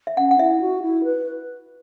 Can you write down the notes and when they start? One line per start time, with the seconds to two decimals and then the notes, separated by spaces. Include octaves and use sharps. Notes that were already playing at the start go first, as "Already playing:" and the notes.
0.07 E5
0.17 C#4 F#5
0.31 F#5
0.39 E4 E5
0.61 F#4
0.82 E4
1.04 B4